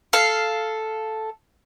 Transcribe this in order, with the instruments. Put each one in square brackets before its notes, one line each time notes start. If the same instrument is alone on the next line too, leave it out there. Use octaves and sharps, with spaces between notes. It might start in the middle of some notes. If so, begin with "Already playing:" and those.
[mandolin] A4 F5